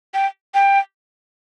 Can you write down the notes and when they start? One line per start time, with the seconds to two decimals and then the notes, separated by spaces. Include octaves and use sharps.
0.14 G5
0.54 G5